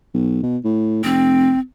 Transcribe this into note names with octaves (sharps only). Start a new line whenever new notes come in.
B1
B2
A2
F1 C4